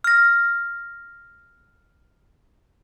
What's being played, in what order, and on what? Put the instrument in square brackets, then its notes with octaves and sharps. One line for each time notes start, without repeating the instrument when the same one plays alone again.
[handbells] F6 A#6